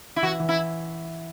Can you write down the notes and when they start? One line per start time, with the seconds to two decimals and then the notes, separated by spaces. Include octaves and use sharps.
0.16 E4
0.23 E3 F#4
0.40 E3
0.49 E4